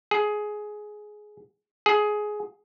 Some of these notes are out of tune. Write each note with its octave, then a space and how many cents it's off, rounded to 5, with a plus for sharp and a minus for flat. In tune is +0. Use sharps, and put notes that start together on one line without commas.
G#4 +15
G#4 +15